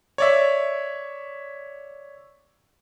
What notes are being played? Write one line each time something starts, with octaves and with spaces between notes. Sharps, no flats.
C#5 D5 E5